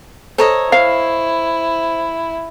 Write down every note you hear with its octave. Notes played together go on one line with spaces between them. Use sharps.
A4 C5 C#5 D#5 A#5
E4 C5 F5